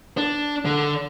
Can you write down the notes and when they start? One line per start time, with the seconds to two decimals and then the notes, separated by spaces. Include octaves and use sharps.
0.17 D4
0.65 D3